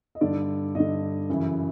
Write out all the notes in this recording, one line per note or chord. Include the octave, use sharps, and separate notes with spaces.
D#5
G2 D3 D5
G2 D3 D#5
F#2 C#3 E3